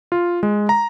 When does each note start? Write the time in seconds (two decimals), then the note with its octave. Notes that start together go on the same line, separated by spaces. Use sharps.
0.12 F4
0.43 G#3
0.69 A#5